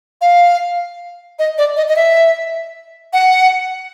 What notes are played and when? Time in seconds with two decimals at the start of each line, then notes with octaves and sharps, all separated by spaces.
0.21 F5
1.39 D#5
1.58 D5
1.77 D#5
1.88 D#5
1.96 E5
3.13 F#5